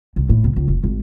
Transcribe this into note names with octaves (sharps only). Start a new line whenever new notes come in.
C2
A2
C2
C#2
F1
G#1